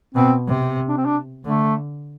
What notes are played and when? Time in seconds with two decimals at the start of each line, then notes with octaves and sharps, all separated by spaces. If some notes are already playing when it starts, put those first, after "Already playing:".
0.15 B2 C4
0.48 C3
0.88 D4
0.97 C4
1.05 D4
1.45 D3 A3